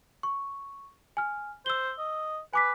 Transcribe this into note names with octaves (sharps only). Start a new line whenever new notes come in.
C#6
G#5 F6
C5 E6 G7
D#5
B4 G#5 D6 B6